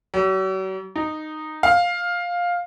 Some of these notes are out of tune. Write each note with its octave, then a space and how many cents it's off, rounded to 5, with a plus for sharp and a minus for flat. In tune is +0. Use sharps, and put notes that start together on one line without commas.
F#3 +45
D#4 -10
F5 +10